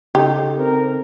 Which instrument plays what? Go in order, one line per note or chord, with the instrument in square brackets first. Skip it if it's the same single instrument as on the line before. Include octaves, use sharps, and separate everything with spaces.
[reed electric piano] C#3 D#4 A4 [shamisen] G4
[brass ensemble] C4 A#4